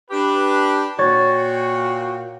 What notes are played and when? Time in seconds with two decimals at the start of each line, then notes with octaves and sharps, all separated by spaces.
0.11 D4 G4 B4
0.99 A#2 F#4 C#5 G5 A6